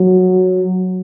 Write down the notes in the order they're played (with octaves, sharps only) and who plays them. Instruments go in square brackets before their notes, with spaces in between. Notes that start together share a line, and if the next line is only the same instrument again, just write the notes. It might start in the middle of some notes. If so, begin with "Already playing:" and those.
Already playing: [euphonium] F#3